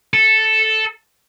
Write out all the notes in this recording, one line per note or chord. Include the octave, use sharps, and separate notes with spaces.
A4